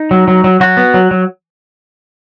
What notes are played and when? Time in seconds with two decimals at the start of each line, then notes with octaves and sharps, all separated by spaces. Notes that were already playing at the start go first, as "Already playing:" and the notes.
Already playing: D#4
0.11 F#3
0.28 F#3
0.44 F#3
0.60 F#3 F#4
0.77 B3
0.94 F#3
1.11 F#3